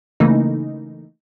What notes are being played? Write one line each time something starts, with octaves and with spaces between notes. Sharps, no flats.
C#3 E3 A3 A#3 D#4